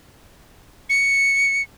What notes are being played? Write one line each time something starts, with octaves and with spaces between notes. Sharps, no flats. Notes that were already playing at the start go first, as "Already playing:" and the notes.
C#7